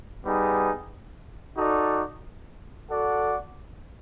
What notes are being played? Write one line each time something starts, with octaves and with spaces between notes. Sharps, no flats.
G3 B3 D#4 G#4
D#4 F#4 A4 D5
F#4 A4 D5 F#5